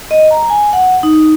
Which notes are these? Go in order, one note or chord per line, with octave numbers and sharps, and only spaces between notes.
D#5
A#5
G#5
F#5
D#4